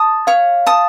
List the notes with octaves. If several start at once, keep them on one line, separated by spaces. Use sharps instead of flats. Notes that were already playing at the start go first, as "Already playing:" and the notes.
Already playing: A5 D#6
C#5 F5
A5 D#6